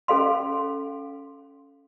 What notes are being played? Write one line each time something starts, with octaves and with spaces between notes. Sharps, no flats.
C#4 A4 F5 C6